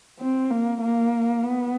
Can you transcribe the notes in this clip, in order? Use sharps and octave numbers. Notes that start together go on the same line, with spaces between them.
C4
A#3
A#3
B3